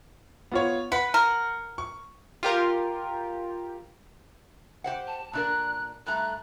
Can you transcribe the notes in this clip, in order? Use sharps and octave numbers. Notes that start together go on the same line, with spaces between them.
B3 F4 C#5
B4 F#5
A#4
C#6
F4 G4 A#4
G4 C5 F#5
A5
A#2 D4 A#4 F#6
G2 A3 A#5 F#6